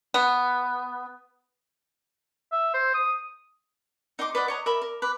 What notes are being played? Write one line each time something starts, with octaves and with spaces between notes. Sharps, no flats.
B3
E5
C5
D#6
D#4 D#5 C6 D6
B4 D5 D#5 F#5
C#5 D#5 A#5
A#4 D5 E5 B5
A#4
B4 D6